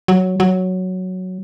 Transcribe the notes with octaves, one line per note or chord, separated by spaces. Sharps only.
F#3
F#3